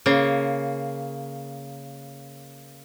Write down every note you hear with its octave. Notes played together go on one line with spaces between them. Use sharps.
C#3 A#3